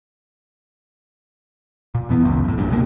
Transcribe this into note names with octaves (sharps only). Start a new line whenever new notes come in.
A#2
E2 E3 B3
G1 C#2 F#2
F2 A2
A#1 G2 A#2
C#2 B2 F3 A#3